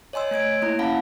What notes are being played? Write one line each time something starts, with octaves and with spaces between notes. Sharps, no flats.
C#5 D#5 G#5 C6 E6
A3 C#5 G#6 D7
A#3 E4 A#5
A#3 C#4 F5 F#5 A5 B5